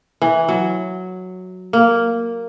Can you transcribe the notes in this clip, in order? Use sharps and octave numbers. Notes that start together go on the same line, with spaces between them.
E3
F#3
A#3